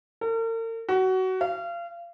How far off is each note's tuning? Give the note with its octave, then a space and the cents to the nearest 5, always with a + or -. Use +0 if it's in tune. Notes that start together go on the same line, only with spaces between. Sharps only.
A#4 -45
F#4 +20
F5 -30